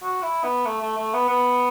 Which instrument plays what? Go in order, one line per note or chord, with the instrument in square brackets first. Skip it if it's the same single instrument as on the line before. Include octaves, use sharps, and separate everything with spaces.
[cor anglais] F#4
E4
B3
A3
A3
A3
B3
B3